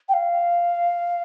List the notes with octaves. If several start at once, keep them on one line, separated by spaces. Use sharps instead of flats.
G5
F5